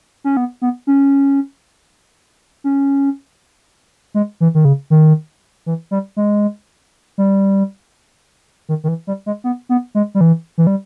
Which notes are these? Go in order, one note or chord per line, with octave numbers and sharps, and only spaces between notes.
C#4
B3
B3
C#4
C#4
G#3
E3
D#3
C#3
D#3
E3
G3
G#3
G3
D#3
D#3
E3
G3
G#3
B3
B3
G#3
G3
E3
E3
G3